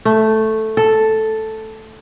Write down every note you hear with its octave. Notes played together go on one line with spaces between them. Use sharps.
A3
A4